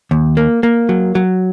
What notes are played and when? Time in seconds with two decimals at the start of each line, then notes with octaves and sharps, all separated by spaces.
0.11 D#2
0.37 A#3
0.63 A#3
0.89 F#3
1.15 F#3